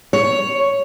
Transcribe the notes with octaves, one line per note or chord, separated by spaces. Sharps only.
C#5